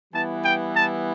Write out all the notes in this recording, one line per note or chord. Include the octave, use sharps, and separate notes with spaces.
E3 G3 B3 E4 A5
G5
A5